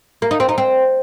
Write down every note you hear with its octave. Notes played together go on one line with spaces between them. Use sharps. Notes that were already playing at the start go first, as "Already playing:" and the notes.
A#3
D#4
C4
D#4
C4